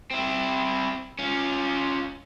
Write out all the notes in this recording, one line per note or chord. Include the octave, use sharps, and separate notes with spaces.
C4 E4
C#4 F4